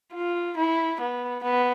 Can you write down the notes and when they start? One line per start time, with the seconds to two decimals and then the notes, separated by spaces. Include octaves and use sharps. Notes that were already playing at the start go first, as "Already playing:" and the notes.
0.14 F4
0.57 E4
1.00 B3
1.43 B3